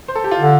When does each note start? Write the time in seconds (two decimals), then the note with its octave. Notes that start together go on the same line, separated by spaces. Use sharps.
0.08 C5
0.15 A4
0.24 G4
0.31 F4
0.40 D3